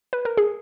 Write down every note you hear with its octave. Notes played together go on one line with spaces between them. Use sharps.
B4
A#4
G#4